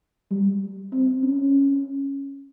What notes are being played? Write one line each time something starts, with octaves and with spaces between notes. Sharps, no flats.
G3
C4
C#4